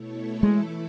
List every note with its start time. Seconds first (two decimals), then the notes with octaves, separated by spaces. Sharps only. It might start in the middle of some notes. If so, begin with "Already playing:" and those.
Already playing: B2 A3 E4 A4 C#5
0.43 E3 G#3 A3 E4 A4